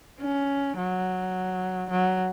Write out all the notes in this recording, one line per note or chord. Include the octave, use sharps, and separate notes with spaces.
C#4
F#3
F#3